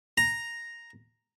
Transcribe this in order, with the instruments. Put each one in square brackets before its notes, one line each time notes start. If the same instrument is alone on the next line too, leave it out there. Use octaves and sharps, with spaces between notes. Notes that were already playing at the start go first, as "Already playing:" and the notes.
[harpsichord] A#5